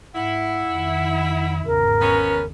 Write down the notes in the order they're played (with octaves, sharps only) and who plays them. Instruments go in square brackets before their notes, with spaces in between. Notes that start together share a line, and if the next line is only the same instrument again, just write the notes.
[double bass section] G#2 [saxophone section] E4 [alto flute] F#5
[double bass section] F2 D#3
[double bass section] G#1 E2 C#3 [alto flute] A#4
[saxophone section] B3 C#4